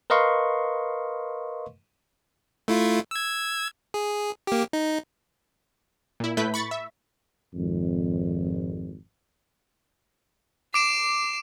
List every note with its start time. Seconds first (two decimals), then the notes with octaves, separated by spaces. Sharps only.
0.10 A#4 B4 D#5 F5 C6 C#6
2.68 A3 E4 F4
3.11 E6 G#6
3.94 G#4
4.47 A#3 G4
4.73 D#4
6.20 A#2 E4
6.37 A2 A3 E4 B4 G6 B6
6.54 B5 C#6 A6 C#7
6.71 E5
7.54 G#1 F2
10.74 D6 C7 D7 E7